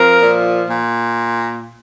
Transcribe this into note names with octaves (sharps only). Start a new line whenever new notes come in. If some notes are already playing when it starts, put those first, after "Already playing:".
Already playing: F3 C4 A#4
A#2
A#2